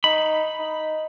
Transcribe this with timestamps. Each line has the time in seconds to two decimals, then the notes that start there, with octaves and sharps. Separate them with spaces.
0.04 D#4 B5
0.59 D#4